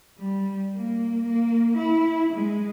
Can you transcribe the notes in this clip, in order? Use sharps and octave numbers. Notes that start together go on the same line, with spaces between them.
G3
A#3
A#3
E4
G#3